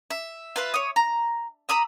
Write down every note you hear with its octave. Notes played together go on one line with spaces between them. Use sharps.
E5
F4 B4 E5
C#5 D#6
A#5
A#5 B5 D#6 E6